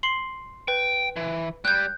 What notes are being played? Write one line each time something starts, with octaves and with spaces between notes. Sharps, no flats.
C6 C7 F#7
B4 G5
E3
G3 F#6 G6